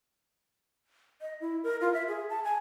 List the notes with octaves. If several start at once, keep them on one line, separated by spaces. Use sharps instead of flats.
D#5
E4
A#4
F4
E5
G#4
A5
G#5